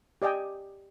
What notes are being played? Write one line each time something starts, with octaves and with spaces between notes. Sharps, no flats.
G4 D5 D#5 G5 G#5